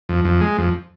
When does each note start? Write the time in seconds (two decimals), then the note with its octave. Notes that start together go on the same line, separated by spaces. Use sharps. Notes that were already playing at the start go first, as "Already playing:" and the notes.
0.09 F2
0.25 F2
0.41 G#3
0.58 F2